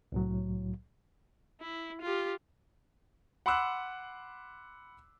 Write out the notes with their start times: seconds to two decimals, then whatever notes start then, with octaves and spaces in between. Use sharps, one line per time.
0.12 C2 A2 F#3
1.61 E4
2.02 F4 G4
3.46 F#5 B5 C6 D6 E6 F#6